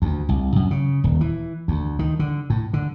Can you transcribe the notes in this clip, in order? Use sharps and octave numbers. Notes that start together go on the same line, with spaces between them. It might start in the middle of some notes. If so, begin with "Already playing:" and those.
D2
C2
F#2
C#3
D#1
E3
D2
D#3
D3
A2
D3